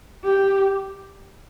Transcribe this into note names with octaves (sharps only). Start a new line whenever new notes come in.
G4